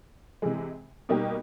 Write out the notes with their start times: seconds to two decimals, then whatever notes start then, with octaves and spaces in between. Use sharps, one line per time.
0.42 C3 E3 G#3
1.09 B2 G3 A#3 D#4 G4